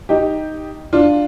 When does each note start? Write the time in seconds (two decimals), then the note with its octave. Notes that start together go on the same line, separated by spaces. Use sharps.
0.09 D#4 G4
0.93 D4 F4